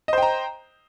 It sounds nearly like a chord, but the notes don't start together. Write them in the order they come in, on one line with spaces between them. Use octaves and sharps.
D#5 C5 G5 A#5